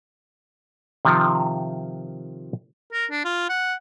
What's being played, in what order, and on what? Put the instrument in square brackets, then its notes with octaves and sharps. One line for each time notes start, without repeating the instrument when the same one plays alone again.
[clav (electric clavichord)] C3 D#3 F3
[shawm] A#4
D4
F4
F#5